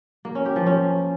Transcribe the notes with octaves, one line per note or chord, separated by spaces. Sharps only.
A#3
C#4
G4
F3
C#4